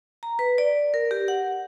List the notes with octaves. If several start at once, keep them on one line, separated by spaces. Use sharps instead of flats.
A#5
B4
D5
A#4
G4
F#5